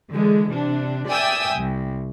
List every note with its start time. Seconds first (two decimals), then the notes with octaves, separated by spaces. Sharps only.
0.10 D3 E3 G#3
0.52 C3 D4
1.07 D5 E5 G5 G#5 D#6 E6
1.55 C2